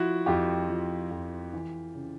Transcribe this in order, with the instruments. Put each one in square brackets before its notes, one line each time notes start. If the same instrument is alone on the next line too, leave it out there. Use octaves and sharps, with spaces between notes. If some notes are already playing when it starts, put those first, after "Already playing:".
Already playing: [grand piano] F3 E4 F#4
F2 F4 G4
F3
F2
E3
C#3